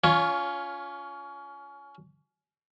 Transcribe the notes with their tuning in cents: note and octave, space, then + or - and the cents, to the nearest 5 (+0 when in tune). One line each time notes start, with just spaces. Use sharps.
C#4 +25 F4 +0 C#5 +0